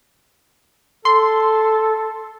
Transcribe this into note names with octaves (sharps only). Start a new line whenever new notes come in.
A4 C6